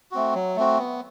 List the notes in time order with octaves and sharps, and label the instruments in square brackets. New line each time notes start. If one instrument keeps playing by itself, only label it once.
[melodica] A3 C4 F#4
F#3
A3 C4 F#4
B3